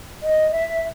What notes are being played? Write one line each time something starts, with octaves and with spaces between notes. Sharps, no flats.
D#5
E5